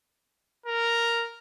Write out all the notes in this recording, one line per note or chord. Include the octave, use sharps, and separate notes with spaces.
A#4